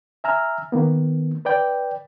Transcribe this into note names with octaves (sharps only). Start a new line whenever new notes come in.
E5 G#5 A#5 E6 F6
D#3 A#3 B3
B4 D5 G5